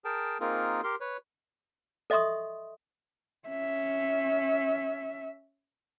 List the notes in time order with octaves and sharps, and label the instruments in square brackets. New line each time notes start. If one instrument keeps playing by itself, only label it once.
[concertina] G#4 A#4 G5 A5
A#3 C4 D#4 F4 G#4 A#4
G4 A#4 C6
B4 C#5
[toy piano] A4 D#5 E5 C6 C#6 D#6
[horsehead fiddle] C#4 E5